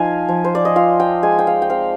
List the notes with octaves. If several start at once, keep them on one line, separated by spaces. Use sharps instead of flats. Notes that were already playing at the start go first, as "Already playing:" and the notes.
Already playing: F3 D#4 F5 G#5
F3
C5
D5
D#5
F4 F5
G5
G#3 G#5
G5
F5
G5
C4 F5